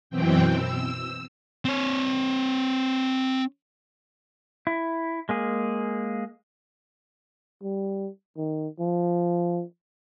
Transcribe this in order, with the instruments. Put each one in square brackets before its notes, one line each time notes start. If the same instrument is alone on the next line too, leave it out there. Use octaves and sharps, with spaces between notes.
[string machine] F#2 B2 E3 C4 G5
E6
[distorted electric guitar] C4 C#5
[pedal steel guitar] E4
G#3 A#3 G#4
[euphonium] G3
D#3
F3